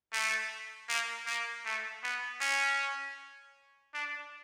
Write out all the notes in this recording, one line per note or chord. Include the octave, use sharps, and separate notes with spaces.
A3
A#3
A#3
A3
B3
C#4
D4